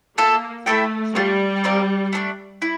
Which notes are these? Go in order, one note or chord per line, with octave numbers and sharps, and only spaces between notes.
A#3 F4 A4 E5
A3 E4 A4 E5 G5
G3 A3 D4 F4
C4 F4 A#4 D5
A3 D4 A4 D5
E4 D5